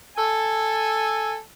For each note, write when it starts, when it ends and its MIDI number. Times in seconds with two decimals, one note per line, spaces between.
0.18 1.38 69
0.18 1.38 80